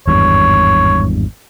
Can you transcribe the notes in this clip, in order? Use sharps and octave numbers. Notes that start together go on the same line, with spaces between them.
G#1 E2 G2 C#5